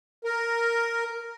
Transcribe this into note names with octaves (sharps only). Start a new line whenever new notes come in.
A#4